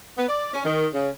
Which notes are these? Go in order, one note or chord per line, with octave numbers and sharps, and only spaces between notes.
B3
D5
C#4
D#3
C#3